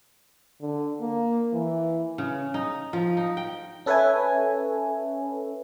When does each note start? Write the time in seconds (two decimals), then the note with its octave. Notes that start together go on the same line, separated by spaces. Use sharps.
0.61 D3
1.01 A#3
1.53 E3
2.18 C#3
2.54 D#4
2.93 F3
3.17 D#4
3.37 G5
3.86 C#4 A4 B4 C#5 E5 G#5